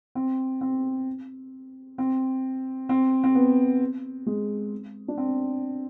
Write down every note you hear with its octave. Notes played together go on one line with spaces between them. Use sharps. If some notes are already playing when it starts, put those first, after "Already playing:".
C4
C4
C4
C4
C4
B3
G#3
D4
C4